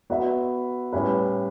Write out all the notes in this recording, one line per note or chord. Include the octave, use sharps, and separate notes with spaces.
B3 F#4 B4 E5
A2 G3 C#4 E4 B4